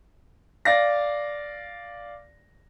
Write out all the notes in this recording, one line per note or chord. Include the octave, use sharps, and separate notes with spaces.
D5 F5 A#6